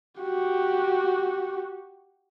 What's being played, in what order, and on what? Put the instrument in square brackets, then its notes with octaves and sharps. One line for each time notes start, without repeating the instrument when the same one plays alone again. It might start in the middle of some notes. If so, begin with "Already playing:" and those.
[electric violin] F#4 G4